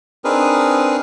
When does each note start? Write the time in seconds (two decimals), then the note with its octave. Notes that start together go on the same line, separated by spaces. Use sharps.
0.24 C4 D4 D#4 G#4 A#4 B4